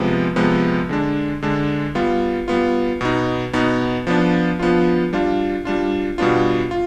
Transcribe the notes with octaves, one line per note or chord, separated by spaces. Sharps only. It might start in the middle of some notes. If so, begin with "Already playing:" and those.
Already playing: C3 F3 G#3 B3
C3 F3 G#3 B3
D3 G#3 D4
D3 G#3 D4
G3 B3 F4
G3 B3 F4
B2 B3 D#4
B2 B3 D#4
F3 B3 D4 F4
F3 B3 D4 F4
G3 D4 F4
G3 D4 F4
B2 G3 B3 D4 F4
F4